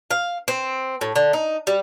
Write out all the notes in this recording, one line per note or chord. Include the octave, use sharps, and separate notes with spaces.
F5
C4
A2
D3
D#4
G3